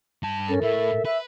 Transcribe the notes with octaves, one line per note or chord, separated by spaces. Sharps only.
G2 A5
C#4 A4 A#4
A2 E5
B4 E5